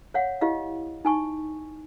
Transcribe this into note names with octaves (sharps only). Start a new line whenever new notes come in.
C#5 F5 F#5
E4 G4 D#5 F5
D#4 G#5 C#6